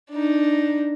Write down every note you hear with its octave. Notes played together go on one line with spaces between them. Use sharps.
D4 D#4